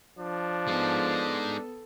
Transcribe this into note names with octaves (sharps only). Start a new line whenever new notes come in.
F3 D4
G#3 B3 D#4 A4